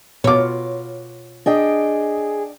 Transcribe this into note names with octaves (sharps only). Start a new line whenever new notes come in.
B2 F4 C#5 D6
D4 G#4 D#5 G5